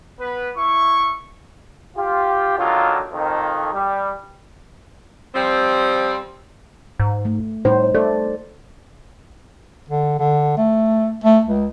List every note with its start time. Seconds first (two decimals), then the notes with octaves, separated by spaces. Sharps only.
0.20 B3 B4
0.56 E4 C#6
1.96 F4 G4
2.57 D3 D#3 F#3 F4
3.12 F2 D#3
3.73 G3
5.35 F3 G3 C4
6.99 G#2
7.25 A3
7.65 A2 G3 D#4 C5
7.95 A3 A4 D5
9.89 D3
10.19 D3
10.57 A3
11.24 A3
11.47 C#2